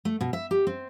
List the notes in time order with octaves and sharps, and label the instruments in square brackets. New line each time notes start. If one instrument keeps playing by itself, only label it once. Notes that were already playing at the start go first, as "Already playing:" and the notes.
[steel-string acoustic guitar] A3
B2
E5
G4
C4